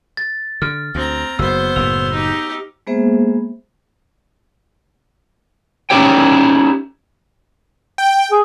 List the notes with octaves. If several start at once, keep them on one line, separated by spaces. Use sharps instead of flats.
A6
D3 F6
D2 C4 A#5
F#1 B3 C5 E6
F#1 A2 E6 F7
D#4 G4
G#3 A#3 B3 G#4 C5 E5
C#4 D#4 E4 G4 C#5 G5
G5
G#4